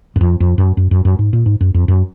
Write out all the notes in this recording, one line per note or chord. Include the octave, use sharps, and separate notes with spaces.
F#2
F2
F2
F#2
F#2
F#2
F#2
G#2
A#2
G#2
F#2
F2
F#2